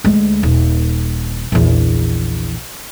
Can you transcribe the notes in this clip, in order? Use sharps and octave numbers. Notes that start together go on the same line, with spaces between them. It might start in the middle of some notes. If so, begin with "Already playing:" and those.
D2 G#3
D#1
A#1 E2